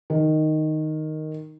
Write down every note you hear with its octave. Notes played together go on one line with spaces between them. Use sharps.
D#3